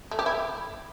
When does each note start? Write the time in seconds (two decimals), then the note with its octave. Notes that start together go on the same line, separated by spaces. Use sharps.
0.11 A3
0.19 G4
0.26 E4